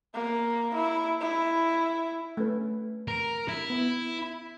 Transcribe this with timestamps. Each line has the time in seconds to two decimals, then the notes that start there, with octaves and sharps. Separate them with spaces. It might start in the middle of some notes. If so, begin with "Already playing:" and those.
0.14 A#3
0.75 E4
1.21 E4
2.37 A3 C#4 B4
3.08 A#4
3.48 E4
3.70 B3